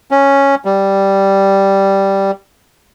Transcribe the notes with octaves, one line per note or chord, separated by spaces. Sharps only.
C#4
G3